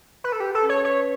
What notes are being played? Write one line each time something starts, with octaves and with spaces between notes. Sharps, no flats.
B4
A4
G4 B4
A4
C#4
C#5
B4 C#5